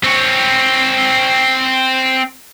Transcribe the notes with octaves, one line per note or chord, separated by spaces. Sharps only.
C4 C#5